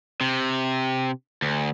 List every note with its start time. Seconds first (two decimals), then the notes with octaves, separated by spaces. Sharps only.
0.21 C3
1.42 D2